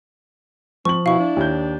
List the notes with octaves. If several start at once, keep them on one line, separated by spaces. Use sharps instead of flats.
F3 C4 C#6 F#7
B2 E4 F5 C#6
D4
D#2 G6